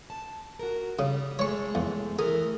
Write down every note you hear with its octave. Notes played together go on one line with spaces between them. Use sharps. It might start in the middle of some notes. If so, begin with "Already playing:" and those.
A5
F#4 A#4
C#3 G3
C3 G#3 A3 C#5 C#6
E2
E3 A3 G#4 A#4